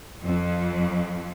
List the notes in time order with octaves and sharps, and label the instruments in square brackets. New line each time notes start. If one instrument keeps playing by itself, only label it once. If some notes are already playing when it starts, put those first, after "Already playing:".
[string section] F2